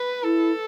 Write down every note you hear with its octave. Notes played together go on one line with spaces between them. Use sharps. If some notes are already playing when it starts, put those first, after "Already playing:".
Already playing: B4
E4 A4